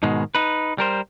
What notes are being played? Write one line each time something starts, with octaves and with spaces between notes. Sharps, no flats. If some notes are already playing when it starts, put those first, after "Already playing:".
G#2 B2 D#3 G#3
D#4 B4
G3 A#4 C5